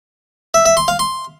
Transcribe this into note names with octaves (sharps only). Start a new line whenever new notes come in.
E5
E5
C6
F5
C6